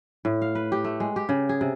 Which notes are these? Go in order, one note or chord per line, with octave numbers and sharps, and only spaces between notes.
A2
F5
B4
G4
A3
G#3
G4
C#3
G#4
C3